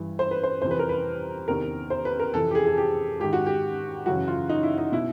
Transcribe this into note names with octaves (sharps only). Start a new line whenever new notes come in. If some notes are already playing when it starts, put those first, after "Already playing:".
Already playing: G2 E3
C5
B4
C5
F2 C3 E3 C5
B4
A#4
B4
E2 C3 D#3 A#4
C5
B4
A#4
F2 C3 E3 A4
G4
G#4
G#4
G4
G#2 D#3 G4
F#4
G4
F#2 C#3 E3 F#4
F4
D#4
E4
D#4
B2 E4